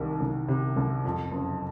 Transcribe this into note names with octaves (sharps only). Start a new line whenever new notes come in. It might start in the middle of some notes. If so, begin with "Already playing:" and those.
Already playing: C2 C3 D#3
C2
C3
C2
F2
F#1